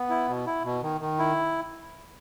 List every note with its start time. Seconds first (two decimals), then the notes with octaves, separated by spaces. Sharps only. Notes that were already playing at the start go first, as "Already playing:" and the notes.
Already playing: B3
0.10 E4
0.29 B2
0.46 E4
0.65 B2
0.83 D#3
1.01 D#3
1.19 E4